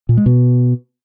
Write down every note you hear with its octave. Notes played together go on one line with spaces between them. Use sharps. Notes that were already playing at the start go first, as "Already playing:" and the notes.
A#2
G#3
B2